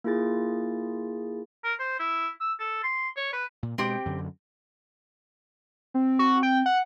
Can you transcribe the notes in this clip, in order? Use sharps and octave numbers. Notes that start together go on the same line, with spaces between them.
A#3 E4 F4 G#4 A6
A#4
C5
E4
E6
A4
C6
C#5
B4
A#2
B2 G#3 C4 G4 G5
F#2 D3
C4
F#4
G5
F#5